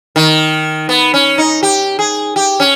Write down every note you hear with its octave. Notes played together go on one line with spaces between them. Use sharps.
D#3
B3
C#4
D#4
G4
G#4
G4
C#4